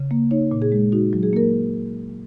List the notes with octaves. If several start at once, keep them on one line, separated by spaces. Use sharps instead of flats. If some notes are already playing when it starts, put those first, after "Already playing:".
Already playing: C#3
A#3
D#4 C#5
A#2
G#4
G#3
D#4 F#4
F#3
G#4
A#3 A#4